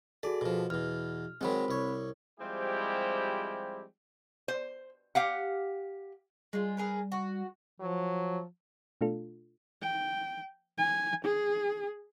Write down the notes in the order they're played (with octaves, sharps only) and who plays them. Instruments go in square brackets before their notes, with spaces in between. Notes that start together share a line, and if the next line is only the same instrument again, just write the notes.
[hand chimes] F#4 G#4 A4 [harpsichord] D5
[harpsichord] B2 F3
[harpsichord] E2 B2 [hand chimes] F6
[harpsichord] D#3 F#3 G#3 [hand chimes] C4 C5 B5
[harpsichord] C2 C#5
[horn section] F3 G3 G#3 C4 E4 G4
[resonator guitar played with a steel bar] C5
G4 F5 F#5
[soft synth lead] G3 [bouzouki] G#3 F4
[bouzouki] G#4 A#4 B4
F#4
[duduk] F3 [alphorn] F#3
[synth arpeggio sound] B2 A3 D4 F4 A4
[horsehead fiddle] G5
G#5
G#4